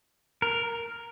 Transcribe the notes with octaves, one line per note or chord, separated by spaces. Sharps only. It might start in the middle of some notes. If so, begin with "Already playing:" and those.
A#4